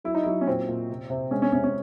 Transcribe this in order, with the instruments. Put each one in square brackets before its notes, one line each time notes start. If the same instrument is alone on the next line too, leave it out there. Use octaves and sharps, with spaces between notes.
[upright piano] F#3 E4
D#4
F#3 E4
C#4
A#2 C4
A#2
C3
C3
G#3 C#4
C#4
C3 C#4
C#4